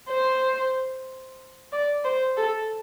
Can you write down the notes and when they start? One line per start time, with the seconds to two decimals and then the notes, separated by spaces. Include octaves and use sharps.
0.09 C5
1.72 D5
2.05 C5
2.37 A4